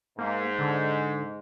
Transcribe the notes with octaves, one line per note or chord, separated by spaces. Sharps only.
G#2 A#3
D3